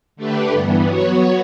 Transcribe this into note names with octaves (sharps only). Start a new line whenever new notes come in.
D3 A3 D4 G4 B4
G2 E3 G3 B3
F#3 B3 F#4 C#5